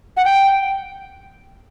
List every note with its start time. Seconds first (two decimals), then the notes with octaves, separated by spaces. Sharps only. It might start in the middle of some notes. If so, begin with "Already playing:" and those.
0.17 F#5
0.25 G5